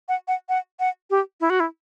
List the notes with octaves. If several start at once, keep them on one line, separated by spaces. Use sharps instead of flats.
F#5
F#5
F#5
F#5
G4
E4
F#4
E4